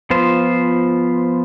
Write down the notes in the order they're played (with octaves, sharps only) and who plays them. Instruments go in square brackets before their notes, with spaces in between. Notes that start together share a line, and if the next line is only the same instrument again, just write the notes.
[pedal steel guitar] F3 B3 F4 C5